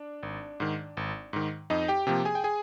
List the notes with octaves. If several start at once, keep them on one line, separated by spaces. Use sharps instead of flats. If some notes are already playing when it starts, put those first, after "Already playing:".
Already playing: D4 D5
G#1
G#2 D#3
G#1
G#2 D#3
F2 D#4 D#5
G4 G5
C3 F3 A#3 G4 G5
G#4 G#5
G5
G#4 G#5